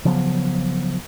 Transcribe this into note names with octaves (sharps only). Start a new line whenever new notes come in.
C#3 F3 F#3 B3